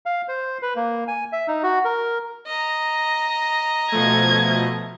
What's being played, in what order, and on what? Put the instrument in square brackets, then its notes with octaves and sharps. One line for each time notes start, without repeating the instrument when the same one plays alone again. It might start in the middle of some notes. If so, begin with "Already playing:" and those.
[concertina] F5
C5
B4
A#3
G#5
E5
D#4
F#4
A#4
[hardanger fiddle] D#5 A#5
[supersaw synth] B2 F3 A3 [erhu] G#6